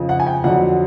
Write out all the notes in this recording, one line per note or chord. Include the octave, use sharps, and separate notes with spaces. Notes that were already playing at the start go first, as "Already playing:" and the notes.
Already playing: F2 C#3 F3
F#5
G#5
G5
F2 D3 F#3 F#5